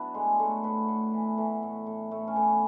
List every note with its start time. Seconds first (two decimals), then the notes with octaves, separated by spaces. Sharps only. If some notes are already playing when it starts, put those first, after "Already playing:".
Already playing: F#3 B3 D4 E4 F#4
0.14 A2 G#3
0.39 A2 A3
0.64 A2 B3
0.89 A2
1.13 E3
1.38 E3 A3
1.63 A2
1.87 A2
2.11 A2 A3
2.27 C#4
2.36 A2 B3